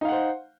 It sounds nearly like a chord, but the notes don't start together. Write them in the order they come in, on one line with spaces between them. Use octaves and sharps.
D#4 F5 F#5 C5